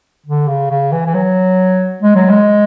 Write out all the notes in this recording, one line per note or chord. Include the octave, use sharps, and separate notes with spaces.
D3
C#3
C#3
E3
E3
F#3
G#3
F#3
G#3